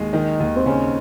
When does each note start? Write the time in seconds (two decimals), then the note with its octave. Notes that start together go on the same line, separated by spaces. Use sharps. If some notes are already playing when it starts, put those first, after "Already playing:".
Already playing: D#2 G#3
0.13 D#3 D#4
0.40 D#2
0.56 C4
0.66 C#3 C#4